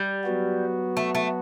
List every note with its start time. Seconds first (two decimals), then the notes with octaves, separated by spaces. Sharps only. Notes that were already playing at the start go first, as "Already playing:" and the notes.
Already playing: G3
0.23 F#3 B3 F#4
0.97 A3
1.15 A3